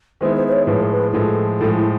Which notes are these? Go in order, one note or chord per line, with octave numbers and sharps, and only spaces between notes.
D#3 G#3 B3 E4 C5
C5
C5
C#5
A2 F3 G#3 B4
A#4
B4
A2 F3 G#3 A4
A2 F3 G#3 A4
E4